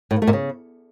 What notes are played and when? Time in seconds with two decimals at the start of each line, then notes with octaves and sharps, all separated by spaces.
0.11 A2
0.16 A#3
0.22 A3
0.27 A#2
0.33 C#3